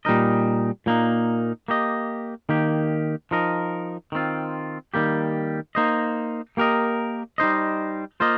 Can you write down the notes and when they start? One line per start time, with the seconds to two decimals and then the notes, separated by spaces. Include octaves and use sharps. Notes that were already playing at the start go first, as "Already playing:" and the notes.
0.05 A#2 G3 D#4 A#4 D#5
0.86 A#2 A#3 D#4
1.68 A#3 G4 D#5
2.49 D#3 A#3 G4
3.31 F3 D#4 A#4 D#5
4.12 D#3 C4 F4
4.94 D#3 G3 A#3 G4
5.75 A#3 D#4 C5 D#5
6.57 A#3 G4 A#4 D#5
7.38 G3 D#4 C5 D#5
8.20 A#3 F4 C5 D#5